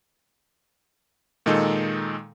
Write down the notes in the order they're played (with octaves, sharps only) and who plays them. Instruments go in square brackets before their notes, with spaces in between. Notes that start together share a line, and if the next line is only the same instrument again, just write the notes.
[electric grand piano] A#2 D#3 G#3 D#4 A4